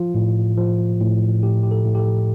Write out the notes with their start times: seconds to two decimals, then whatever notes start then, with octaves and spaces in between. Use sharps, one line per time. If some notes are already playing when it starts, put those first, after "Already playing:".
Already playing: F3 F4
0.15 A2
0.57 F3
1.00 A2
1.43 A2 G4
1.63 G4
1.71 A4
1.85 A2
1.95 G4
1.99 A4